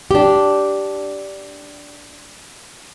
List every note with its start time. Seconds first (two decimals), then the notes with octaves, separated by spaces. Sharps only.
0.11 D4 G4